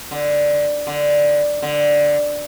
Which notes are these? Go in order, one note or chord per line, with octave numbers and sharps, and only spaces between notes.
D3
D3
D3